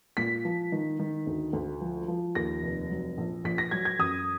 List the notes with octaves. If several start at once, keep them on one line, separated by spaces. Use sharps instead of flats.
A#2 B6
F3
D#3
D#3
D2
D2
F3
F3
D#2 A#6
F1
F#3
A#1
A#1 B6
A#6
F#3 G#6
G#6
F#2 D#6